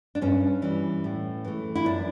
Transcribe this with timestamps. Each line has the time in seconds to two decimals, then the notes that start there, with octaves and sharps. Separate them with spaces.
0.15 D4
0.21 G2 C#4
0.62 E3 G3
1.04 A2
1.45 E3 A3
1.75 E4
1.86 F#2 D4